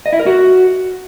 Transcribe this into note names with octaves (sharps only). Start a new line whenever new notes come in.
D#5
E4
A#4
F#4